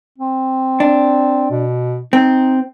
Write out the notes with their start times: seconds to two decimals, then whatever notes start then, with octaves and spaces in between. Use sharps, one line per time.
0.18 C4
0.80 D4
1.51 B2
2.13 C4 D#4